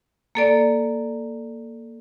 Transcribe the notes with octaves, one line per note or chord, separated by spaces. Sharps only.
A#3 A4 D5